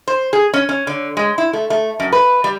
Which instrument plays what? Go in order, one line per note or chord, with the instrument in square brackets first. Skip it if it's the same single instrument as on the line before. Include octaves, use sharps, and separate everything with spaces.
[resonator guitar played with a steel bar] C5
G#4
C#4
C#4
D3
G#3
E4
A3
A3
F#2
B4
G3